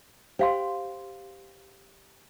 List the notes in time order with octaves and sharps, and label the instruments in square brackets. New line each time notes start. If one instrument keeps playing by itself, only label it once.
[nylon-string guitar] G4 [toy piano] C5 F5 C6